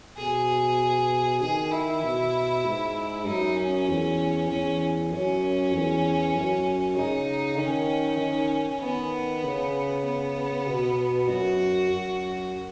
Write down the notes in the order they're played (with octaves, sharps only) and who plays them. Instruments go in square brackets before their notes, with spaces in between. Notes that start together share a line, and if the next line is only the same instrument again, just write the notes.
[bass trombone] B2 [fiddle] G#4
[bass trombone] D#3 [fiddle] G#4
[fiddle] E4
[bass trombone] B2
G#2
[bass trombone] F#2 [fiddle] D#4
[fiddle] C#4
[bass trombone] E2
[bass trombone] E2 [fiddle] C#4
[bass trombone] F#2 [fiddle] C#4
[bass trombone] E2
F#2
[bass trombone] C#3 [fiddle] D#4
[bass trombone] D#3 [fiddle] C#4
[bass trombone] D#3
[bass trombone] D#3 [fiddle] B3
[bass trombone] C#3
[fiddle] B3
[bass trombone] B2
[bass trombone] F#2 [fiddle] F#4
[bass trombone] F#2